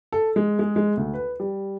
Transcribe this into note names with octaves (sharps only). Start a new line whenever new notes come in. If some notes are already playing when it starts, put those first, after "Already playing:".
A4
G#3
G#3
G#3
D2
B4
G3